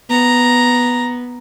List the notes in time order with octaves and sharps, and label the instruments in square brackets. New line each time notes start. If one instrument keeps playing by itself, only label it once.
[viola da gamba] B3 [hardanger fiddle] A#5